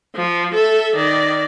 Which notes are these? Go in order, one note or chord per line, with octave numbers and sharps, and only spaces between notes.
F3
A4 E5
D#3 D5